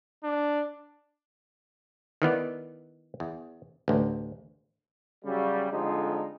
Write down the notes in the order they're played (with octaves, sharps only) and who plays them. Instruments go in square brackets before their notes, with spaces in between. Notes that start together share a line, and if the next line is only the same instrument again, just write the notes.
[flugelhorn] D4
[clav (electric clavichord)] D#3 E3 B3 D5
E2
A1 D2
[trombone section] C#3 F#3 G3
F2 D3 F3 G3 G#3 D#4